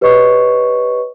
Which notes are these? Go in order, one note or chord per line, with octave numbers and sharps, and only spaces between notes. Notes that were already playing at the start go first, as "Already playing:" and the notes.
G4 B4 C#5 D#5 C#6